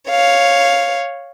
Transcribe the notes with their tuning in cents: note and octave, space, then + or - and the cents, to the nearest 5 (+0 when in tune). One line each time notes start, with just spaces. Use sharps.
C#5 +0 F5 +0